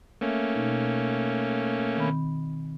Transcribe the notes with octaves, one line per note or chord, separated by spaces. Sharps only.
A3 A#3 C#4 E5
B2 D#4
D#3 C4 B5